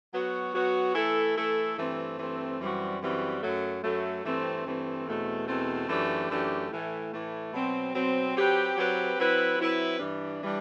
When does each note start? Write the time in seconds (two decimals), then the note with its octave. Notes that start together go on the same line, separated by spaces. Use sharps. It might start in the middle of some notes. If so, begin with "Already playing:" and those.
0.13 F#3 B3 F#4
0.54 F#3 B3 F#4
0.95 E3 A3 E4 A4
1.36 E3 A3 E4 A4
1.77 G2 E3 A3 C4
2.18 G2 E3 A3 C4
2.59 F#2 E3 G3 C4 F#4
3.00 F#2 E3 G3 C4 F#4
3.41 F#2 F#3 A3
3.83 F#2 F#3 A3
4.24 G2 E3 A3 C4
4.65 G2 E3 A3 C4
5.06 E2 B2 A3 C4
5.47 E2 B2 A3 C4
5.88 F#2 E3 A3 D4 G4
6.29 F#2 E3 A3 D4 G4
6.71 A2 E3 A3
7.12 A2 E3 A3
7.53 B2 F#3 C4
7.94 B2 F#3 C4
8.35 F#3 C4 G4 B4
8.76 F#3 C4 G4 B4
9.18 F#3 C4 E4 B4
9.58 F#3 C4 E4 B4
9.99 G2 E3 G3 D4
10.42 E3 G3 D4